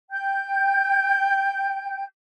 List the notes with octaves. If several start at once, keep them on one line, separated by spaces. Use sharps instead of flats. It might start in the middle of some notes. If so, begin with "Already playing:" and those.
G5 G6